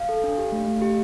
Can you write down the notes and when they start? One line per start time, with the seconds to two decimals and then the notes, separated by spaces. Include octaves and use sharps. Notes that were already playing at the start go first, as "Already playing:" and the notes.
Already playing: F5
0.09 A4
0.24 D4
0.38 G4
0.52 A3
0.68 A3
0.82 G4